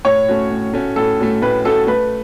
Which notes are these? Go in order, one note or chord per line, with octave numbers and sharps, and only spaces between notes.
A2 C#5
A3 C#4 F#4
A2
A3 C#4 F#4
A2 A4
A3 C#4 F#4
A2 B4
A3 C#4 F#4 A4
A3 B4